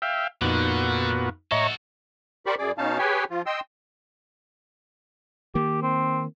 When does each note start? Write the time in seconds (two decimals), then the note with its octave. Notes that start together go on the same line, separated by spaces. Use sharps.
0.02 E5 F5 G5
0.42 F2 A#2 D3 B3 D#4 F#4
1.51 A2 F#4 A4 C#5 D#5 E5 A#5 C#6
2.46 G4 A#4 C5 D5 B5 C#6
2.59 F#2 G#4 D5
2.78 B2 C#4 D#4 F5 A5
2.98 G4 G#4 B4 C#5 G5 G#5
3.30 F3 F4
3.46 D#5 G5 C6 E6
5.55 D#3 A#3 G4
5.82 C4